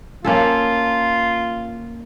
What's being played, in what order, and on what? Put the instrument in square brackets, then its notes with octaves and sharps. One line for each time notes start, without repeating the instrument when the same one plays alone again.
[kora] A#3 C#4 A4 [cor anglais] F4